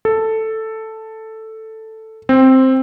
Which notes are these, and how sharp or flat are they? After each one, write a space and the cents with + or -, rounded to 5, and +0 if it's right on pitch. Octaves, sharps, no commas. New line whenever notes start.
A4 +5
C4 +5